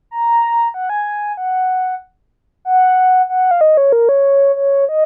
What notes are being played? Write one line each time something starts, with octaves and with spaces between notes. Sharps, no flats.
A#5
F#5
G#5
F#5
F#5
F#5
F5
D#5
C#5
A#4
C#5
C#5
D#5